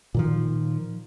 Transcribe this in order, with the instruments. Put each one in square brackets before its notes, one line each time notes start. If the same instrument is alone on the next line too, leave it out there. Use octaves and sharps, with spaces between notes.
[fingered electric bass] A#2 D#3 F3